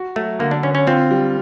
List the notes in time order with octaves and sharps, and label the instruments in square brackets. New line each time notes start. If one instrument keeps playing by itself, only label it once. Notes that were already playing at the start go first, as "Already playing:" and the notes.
Already playing: [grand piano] F#4
[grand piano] F#3 [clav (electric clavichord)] A3
[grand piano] D3 [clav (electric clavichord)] A#3
[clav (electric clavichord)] D4
[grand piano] D3 [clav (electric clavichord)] C#4
[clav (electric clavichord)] C#4
[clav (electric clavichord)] C4 [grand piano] F4
[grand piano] G3